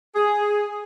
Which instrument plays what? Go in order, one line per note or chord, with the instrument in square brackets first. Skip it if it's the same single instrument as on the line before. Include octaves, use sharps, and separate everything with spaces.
[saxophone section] G#4